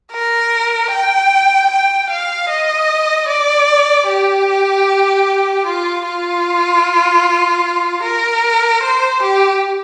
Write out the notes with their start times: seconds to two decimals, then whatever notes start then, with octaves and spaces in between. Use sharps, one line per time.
0.12 A#4
0.90 G5
1.70 G5
2.10 F5
2.49 D#5
3.28 D5
4.07 G4
5.66 F4
6.05 F4
8.03 A#4
8.82 C5
9.22 G4